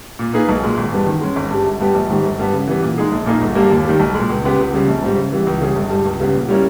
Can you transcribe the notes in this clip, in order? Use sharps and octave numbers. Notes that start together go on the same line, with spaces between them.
A#2
A#3 D#4 G#4 B4
B1
A#2 G#3
G#1
G2 E3 G3 B3
D#3
G#3 C#4
G#1
G2 G3
G1
G2 G3 B3 G4
A#1
G#2 D#3 G3
G1
G2 G3 B3
C#3
E3 G3 B3
A#2
G#3 D#4 G#4
A#1
A#2 A#3 D#4 G#4
G1
G2 G3 A#3
D#2
D#3 G3
B1
A#2 G#3
C#2
C#3 G#3 B3 G4
C#2
C#3 G3
A#1
G#2 G3
C#3
E3 G3 B3
C#2
C#3 G3 C#4 G#4
G1
G2 G3
C#2
C#3 G3 B3
A#2
G3 C#4 E4 A#4